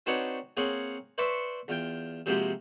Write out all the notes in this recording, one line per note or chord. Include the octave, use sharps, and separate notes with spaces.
C4 D4 D#4 F#4 B4 C#5
A#3 C4 G#4 C#5 F#5
B4 C5 D5 E5 C6 C#6
E2 F4 G5
C3 F3 G#3 A#3 F#4 G4